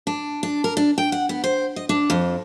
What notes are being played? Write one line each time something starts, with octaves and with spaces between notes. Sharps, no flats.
D4
D4
A#4
D4
G5
F#5
B3
C5
D#5
D4
F2